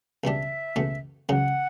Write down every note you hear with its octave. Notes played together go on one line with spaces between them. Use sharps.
C#2 B2 G3 D4 E5
C#2 B2 A3
C#2 C#3 F#3 F#5